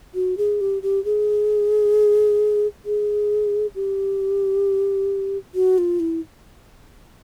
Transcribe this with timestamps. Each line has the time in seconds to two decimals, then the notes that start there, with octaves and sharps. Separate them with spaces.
0.15 F#4
0.37 G#4
0.61 G4
0.82 G4
1.05 G#4
2.86 G#4
3.75 G4
5.55 F#4
5.78 F4
6.00 E4